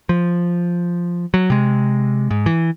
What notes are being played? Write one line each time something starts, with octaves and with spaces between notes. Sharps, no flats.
F3
F#3
C3 G#3
G#2
E3